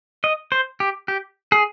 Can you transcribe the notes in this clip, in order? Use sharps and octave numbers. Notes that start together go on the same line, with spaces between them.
D#5
C5
G4
G4
G#4